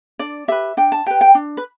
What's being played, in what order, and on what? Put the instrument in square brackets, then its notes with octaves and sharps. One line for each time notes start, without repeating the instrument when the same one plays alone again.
[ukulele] D4 D5
G4 B4 E5
D4 G5
A5
G4 B4 G5
G5
D4
B4